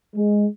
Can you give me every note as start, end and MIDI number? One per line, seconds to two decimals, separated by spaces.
0.14 0.46 56